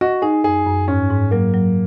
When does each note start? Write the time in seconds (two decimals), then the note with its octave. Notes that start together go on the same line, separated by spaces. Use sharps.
0.01 F#4 D#5
0.22 D#4 G#4
0.44 F#2 G#4
0.67 F#2
0.88 G#2 C#4
1.10 G#2
1.31 F#3 A#3
1.54 F#3